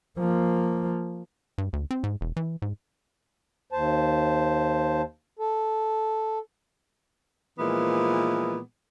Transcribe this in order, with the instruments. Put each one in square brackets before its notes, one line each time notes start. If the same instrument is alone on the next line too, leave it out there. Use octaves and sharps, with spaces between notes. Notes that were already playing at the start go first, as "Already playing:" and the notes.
[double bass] F3 A#3
[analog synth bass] G2
D2
C4
G#2
E1
E3
G#2
[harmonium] D#2 C5 A5
A4
[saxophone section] A#2 E3 F3 G#3 B3